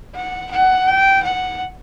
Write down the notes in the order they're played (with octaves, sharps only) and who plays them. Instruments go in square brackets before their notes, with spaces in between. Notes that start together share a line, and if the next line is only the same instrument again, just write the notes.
[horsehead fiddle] F#5
F#5
G5
F#5